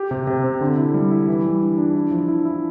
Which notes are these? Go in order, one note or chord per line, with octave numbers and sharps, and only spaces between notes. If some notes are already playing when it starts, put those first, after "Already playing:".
Already playing: G4
C3
C3
C4
D3
E4
G3
E4
E3
G3
D4
D4
E4
F3
E4
E4